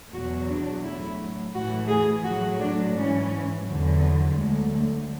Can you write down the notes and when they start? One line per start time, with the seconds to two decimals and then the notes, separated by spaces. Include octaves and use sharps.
0.12 E2 B2 F#3 F#4
0.49 D4
0.83 A2 F#3 E4
1.53 A2 E3 F#4
1.89 G#4
2.25 A2 F#3 F#4
2.60 D4
2.95 G#2 E3 C#4
3.65 E2 D3 F#3
4.01 B3
4.36 D2 D3 F#3 G#3
4.72 A3